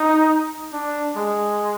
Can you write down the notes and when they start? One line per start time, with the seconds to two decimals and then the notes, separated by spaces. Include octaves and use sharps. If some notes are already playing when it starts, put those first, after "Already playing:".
Already playing: D#4
0.73 D4
1.16 G#3